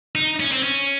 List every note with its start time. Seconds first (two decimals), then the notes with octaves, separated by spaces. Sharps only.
0.15 D#4
0.40 C#4
0.52 C4
0.63 C#4